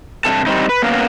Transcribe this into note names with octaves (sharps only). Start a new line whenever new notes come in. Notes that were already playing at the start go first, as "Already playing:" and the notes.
G2 C3 A4 A5
G3 C4 D#4
B4
A#3 B3 C#4 A#4 F5